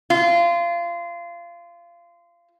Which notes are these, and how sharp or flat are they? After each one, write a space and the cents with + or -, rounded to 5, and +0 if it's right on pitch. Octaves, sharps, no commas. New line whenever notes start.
F4 -25